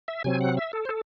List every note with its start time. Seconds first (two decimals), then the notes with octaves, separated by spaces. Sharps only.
0.08 E5
0.24 C3 F#3 C4 G#5
0.41 F#5
0.57 E5
0.73 A4
0.85 C5
0.89 A4